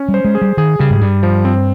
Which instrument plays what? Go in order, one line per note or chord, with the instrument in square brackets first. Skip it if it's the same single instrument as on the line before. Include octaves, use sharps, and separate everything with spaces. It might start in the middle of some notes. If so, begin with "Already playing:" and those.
Already playing: [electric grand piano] C#4
[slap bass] G3
[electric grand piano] C5
[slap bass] G#3
[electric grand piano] G#4
[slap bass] G3
[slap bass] D#3 [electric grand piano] G#4
[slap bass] C#3 [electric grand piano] G3
[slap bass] G#2
[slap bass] G2 [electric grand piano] G3
[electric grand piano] F3
C4